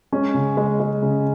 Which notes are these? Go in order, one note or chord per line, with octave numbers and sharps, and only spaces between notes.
G#3 C#4
C#3
G#3
G#3
C#3